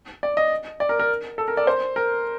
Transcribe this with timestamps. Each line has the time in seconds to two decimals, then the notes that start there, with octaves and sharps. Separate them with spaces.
0.23 D5
0.37 D#5
0.80 D5
0.89 A#4
0.99 A#4
1.38 A4
1.48 A#4
1.57 D5
1.67 C5
1.96 A#4